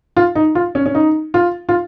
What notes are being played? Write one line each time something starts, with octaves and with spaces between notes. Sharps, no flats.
F4
D#4
F4
C#4
C#4
D#4
F4
F4